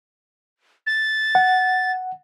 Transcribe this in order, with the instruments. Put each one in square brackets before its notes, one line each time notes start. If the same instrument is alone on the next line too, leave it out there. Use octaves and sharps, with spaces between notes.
[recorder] A6
[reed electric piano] F#5